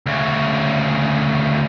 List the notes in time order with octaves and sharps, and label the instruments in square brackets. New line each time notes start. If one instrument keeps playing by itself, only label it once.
[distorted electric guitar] D2 C#3